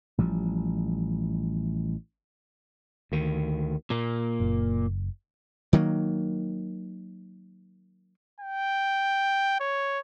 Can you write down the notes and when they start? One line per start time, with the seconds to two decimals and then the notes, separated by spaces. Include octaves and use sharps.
0.18 A1 F3 G3
3.12 D2 D#3
3.90 A#2 A#3
4.40 F#1
5.73 D#3 F#3 G#3 A#3
8.40 G5
9.60 C#5